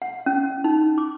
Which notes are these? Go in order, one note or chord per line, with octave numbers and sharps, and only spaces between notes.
F#5
C#4
D#4
D6